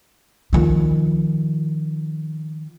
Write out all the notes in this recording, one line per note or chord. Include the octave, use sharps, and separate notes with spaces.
D#3 F3